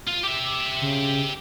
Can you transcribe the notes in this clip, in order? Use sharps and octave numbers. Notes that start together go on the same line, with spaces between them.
F4
G4 E5 D6
C#3